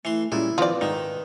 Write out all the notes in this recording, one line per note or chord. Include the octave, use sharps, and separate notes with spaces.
E3 A3 C6
A#2 G3 G#3 C#4 E4
D#3 F3 C4 F4 B4 D5
G#2 D#3 D#4